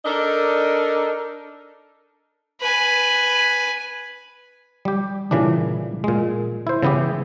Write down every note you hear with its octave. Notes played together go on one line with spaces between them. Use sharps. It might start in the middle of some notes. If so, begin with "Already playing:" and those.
D4 D#4 A4 A#4 D5 D#5
B4 G#5
G3 G4
A#2 C#3 E3 G3 D4
A#2 G#3
E4 C5
C#3 E3 B3 E4 G4